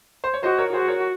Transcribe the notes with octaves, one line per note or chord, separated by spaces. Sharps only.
C5
C#5
F#4 C5 D#5
A#4 C#5
F#4 G#4 C5
A#4 C#5